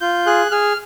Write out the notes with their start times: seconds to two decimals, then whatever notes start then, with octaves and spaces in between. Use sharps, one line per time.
0.01 F4 G6
0.26 G#4 F#6
0.51 G#4 F6